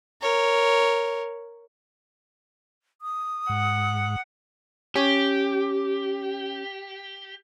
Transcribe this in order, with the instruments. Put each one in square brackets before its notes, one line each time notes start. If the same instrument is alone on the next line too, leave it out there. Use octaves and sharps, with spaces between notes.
[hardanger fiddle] A#4 C#5
[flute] D#6
[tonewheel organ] G#2 [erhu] F#5
[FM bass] C#4 [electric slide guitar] G4